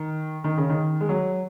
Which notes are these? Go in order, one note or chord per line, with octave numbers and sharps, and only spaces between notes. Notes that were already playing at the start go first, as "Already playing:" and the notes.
Already playing: D#3
D#3
C#3
D#3
G#3
F#3